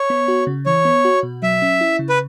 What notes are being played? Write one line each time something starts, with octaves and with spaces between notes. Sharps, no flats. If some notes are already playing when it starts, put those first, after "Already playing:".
Already playing: C#5
B3
F#4
C#3
E3 C#5
B3
F#4
B2
F#3 E5
C#4
E4
C#3
B4